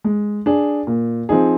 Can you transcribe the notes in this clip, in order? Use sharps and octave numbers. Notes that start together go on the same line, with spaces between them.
G#3
D4 G#4
A#2
F3 C4 D#4 G#4